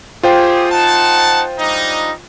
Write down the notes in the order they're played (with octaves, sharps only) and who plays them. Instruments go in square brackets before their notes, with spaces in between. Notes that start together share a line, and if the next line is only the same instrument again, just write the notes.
[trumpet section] A3 G4 G#4 [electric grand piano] F4 C5 G5
[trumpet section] D#4 F#5 A5
G3 D4 D#4